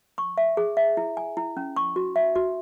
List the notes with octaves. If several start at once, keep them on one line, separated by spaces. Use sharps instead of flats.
C#6
E5
G#4
E5
E4
G#5
E4
C#4
C#6
F#4
E5
F#4